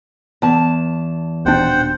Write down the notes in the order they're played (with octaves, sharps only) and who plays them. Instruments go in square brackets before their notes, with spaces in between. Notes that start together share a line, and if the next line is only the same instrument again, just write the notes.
[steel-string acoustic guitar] E2 A5
[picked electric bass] D#1 B2 D4 [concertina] C5 F#5 G5